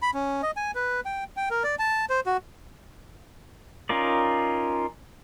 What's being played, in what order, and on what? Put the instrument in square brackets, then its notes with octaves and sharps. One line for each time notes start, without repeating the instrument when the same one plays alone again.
[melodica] B5
C#4
D#5
G#5
B4
G5
G5
A#4
D5
A5
C5
F#4
[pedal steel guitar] C#4 D#4 F4 A#4 D5